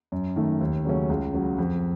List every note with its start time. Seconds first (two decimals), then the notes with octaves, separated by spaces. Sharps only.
0.12 F#2
0.36 D#3 A3
0.61 D#2
0.85 C#3 F#3 A3 C#4
1.09 C#2
1.33 C#3 F#3
1.59 F2